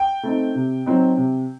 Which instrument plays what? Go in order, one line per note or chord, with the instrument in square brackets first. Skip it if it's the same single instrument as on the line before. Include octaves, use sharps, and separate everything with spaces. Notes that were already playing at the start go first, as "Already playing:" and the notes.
Already playing: [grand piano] G5
[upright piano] A3 C4 D#4
C3
F#3 C4 D#4
C3